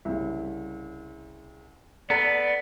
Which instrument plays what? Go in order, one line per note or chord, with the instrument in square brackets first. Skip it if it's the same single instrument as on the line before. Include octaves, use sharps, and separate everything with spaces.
[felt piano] C2 C#3
[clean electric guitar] B3 [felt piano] A4 A#5 [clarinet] D5